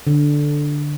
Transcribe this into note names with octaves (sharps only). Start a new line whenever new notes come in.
D3